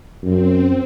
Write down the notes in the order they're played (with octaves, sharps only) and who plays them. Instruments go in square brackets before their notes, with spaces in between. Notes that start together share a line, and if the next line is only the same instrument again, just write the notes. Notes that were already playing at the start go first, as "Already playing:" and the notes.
[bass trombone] F#2 [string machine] C4